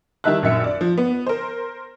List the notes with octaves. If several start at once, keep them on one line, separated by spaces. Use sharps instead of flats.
D#3 G3 E4 E5 A5 F#6
A#1 F#2 E5 C#7
D5
F3
B3
A#4 C5